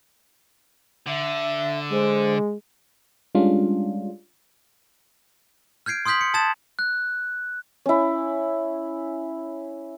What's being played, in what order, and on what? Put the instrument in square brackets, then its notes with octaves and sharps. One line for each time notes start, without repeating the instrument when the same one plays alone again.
[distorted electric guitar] D3 [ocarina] E5
[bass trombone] G#3 [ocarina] C5
[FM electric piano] G3 G#3 C#4 D4 F4
[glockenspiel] F6 G6 G#6 C7 D7
C6 D#6 F6 G6 B6 F#7
C#7
A5 D#6 G#6 A6 E7
F#6
[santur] C#4 E4